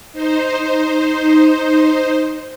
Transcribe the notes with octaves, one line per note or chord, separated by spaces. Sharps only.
D#4 C5